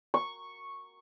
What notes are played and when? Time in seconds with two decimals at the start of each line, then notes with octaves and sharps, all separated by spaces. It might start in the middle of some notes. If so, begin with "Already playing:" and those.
0.14 C#6